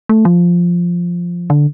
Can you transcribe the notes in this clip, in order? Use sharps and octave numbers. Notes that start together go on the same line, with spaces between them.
A3
F3
D3